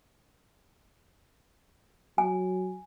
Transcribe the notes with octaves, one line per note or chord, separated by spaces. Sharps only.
F#3 G#5